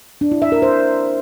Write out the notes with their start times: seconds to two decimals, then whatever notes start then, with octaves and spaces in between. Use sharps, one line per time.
0.21 D4
0.31 E4
0.42 E5
0.52 A#4
0.62 C5